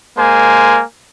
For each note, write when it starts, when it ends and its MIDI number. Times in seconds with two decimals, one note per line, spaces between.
0.17 0.81 56
0.17 0.81 58
0.17 0.81 72
0.17 0.81 80